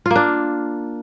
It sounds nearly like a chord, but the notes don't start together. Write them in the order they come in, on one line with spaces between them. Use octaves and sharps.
F4 A#3 D4